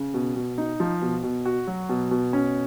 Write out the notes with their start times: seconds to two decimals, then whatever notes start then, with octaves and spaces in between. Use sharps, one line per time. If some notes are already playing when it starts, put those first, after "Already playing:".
Already playing: C#3
0.14 B2
0.36 B2
0.58 D#4
0.80 F3
1.02 B2
1.23 B2
1.45 F#4
1.67 F#3
1.89 B2
2.11 B2
2.33 C#4